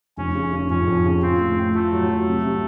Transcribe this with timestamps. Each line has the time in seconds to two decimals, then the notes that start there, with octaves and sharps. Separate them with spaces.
0.17 F1 C#4
0.35 C#3
0.52 C#3
0.70 F2 C#4
0.88 F2
1.05 C#3
1.22 C4 F4
1.39 A2
1.57 A2
1.74 A3 F4
1.92 F#3
2.09 F#3
2.27 C3
2.45 C3